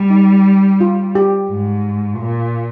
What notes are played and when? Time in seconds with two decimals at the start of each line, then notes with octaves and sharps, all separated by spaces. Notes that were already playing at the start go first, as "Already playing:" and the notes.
Already playing: G3
0.10 D#4
0.81 F4
1.15 G4
1.50 G#2
2.19 A#2